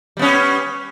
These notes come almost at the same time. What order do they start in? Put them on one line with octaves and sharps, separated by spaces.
G3 B3 C#4